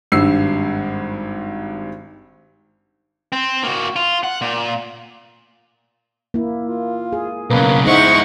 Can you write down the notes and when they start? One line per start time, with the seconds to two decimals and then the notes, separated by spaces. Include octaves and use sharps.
0.12 G#1 G2 E6 C7
3.32 C4
3.63 A#3 F#4
3.96 F4
4.24 F#5
4.42 A#2
6.34 A#3 E4
6.68 F4
7.13 G#4
7.50 B1 C#3 A#3 B3 B4
7.86 G#2 G#3 D#4 E4 C5 D#5 F#5 C#6